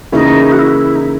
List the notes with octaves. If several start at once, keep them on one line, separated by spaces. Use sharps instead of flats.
C#3 E3 A#3 D#4 E4
F#4
E4
D#4